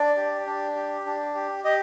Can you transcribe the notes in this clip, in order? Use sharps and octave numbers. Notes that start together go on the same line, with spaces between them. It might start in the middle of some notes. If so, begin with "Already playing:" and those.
Already playing: D4 D5
G4
D4
G4
D4
G4
G4 D#5